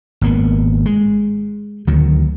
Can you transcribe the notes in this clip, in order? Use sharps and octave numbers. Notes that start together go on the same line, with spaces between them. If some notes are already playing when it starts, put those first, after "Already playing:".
G#1 A#3 B3
G#3
D2 D#3 F#3